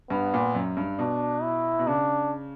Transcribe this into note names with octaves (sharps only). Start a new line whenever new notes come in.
G2 B3
A#2
F#2
G2
B2 D4
E4
B2
C#3 D4